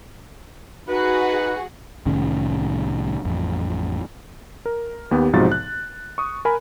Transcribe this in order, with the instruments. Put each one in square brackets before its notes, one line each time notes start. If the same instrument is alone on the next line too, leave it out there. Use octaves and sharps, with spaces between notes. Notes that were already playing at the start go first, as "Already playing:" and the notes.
[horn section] D#4 B4 [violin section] F#4 G#4
[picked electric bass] C2 A2 D#3 C#4
A1 F2
[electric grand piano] A#4
D#2 B3 G4
B1 G#2 C3 F3 F#4 A6
F#6
C#6 D#6
A#4 G#5 B5